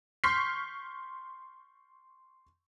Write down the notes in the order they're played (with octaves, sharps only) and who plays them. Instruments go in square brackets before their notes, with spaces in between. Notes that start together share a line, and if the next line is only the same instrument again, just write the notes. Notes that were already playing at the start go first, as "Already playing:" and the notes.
[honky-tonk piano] C6 C#6 F6 G6 B6 C7